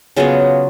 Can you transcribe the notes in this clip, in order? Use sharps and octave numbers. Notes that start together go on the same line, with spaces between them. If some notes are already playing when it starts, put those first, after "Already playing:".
C#3 F#3 B3 F4 G#4